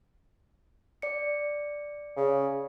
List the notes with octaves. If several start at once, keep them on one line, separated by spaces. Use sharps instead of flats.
D5 C#7
C#3